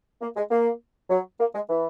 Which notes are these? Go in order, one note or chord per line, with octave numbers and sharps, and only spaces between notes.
A#3
G#3
A#3
F#3
A#3
G#3
E3